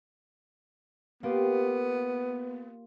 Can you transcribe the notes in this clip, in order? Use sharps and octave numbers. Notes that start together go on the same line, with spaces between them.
A#3 B3 F4 G4